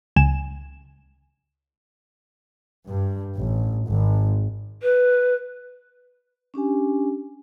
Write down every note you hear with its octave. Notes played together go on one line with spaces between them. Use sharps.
C#2 G#5 E7
G2
A1
G#1
B4
C#4 D4 G4 G#5